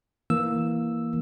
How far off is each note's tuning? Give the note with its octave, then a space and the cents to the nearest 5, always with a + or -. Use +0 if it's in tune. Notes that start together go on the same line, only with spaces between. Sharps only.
E3 +0 A#3 +0 E6 +0